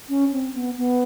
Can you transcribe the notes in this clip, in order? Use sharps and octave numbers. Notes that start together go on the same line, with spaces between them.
C#4
C4
B3
B3